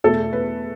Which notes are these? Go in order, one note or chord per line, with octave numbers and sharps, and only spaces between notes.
E2 B2 A3 A4
B4